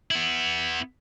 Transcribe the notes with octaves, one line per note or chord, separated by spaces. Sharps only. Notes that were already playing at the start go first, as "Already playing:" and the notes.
B3 E4